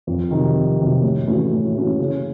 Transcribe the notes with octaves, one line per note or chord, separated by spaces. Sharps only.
F2
C3 D#3 F#3
F2
C3 D#3 F#3
A2
E3 A3 C#4 F#4
A2
E3 A3 C#4 F#4
C#3